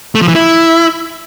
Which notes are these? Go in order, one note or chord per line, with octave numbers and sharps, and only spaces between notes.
A3
F3
E3
E4